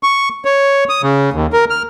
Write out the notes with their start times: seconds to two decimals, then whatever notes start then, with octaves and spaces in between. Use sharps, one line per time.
0.03 C#6
0.45 C#5
0.89 D#6
1.03 C#3
1.33 D#2
1.53 A#4
1.70 F6